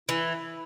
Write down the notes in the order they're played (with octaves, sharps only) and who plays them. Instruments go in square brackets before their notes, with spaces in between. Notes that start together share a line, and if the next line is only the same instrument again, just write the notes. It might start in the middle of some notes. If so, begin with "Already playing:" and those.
[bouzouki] E3 [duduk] E4